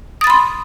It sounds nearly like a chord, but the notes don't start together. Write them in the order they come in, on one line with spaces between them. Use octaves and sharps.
D#6 A6 B5 C6